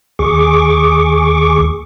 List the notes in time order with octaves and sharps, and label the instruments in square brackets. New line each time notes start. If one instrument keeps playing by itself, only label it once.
[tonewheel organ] D#2 G#4 C#6 D6